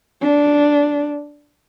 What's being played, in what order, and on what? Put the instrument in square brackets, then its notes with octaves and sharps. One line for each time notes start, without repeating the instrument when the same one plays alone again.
[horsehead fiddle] D4